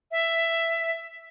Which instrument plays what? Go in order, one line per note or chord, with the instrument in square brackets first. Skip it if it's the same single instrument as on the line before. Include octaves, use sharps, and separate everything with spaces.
[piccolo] E5